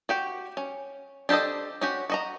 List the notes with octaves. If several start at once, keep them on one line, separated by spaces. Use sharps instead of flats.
F#4 G4 G5
C#4
D4 G4 A4 C5 D#5
C#4 F#4 G4
F#4 D#5 A#5